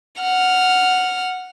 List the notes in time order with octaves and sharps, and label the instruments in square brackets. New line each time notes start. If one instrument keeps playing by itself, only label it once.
[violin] F#5 F6